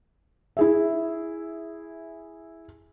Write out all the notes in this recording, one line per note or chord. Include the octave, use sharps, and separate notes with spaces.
E4 G#4 E5